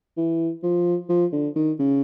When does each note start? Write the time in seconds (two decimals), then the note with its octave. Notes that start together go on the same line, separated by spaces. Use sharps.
0.17 E3
0.63 F3
1.09 F3
1.33 D3
1.56 D#3
1.79 C#3